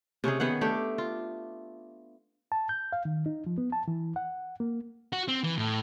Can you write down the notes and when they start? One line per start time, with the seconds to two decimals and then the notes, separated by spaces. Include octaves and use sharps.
0.24 C3 C#4 D#4 G#4
0.40 D#3 B3 G#4 F#5
0.61 A3 D4 G4
0.98 F4
2.52 A5
2.69 G6
2.93 F5
3.05 D#3
3.26 D#4
3.47 F3
3.58 B3
3.72 A5
3.88 E3
4.16 F#5
4.60 A#3
5.13 F#4
5.28 C4
5.44 E3
5.58 A2